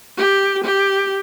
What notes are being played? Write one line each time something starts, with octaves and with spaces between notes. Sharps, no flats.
G4
G4